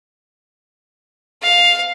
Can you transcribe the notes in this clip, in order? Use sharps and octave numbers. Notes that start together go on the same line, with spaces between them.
F5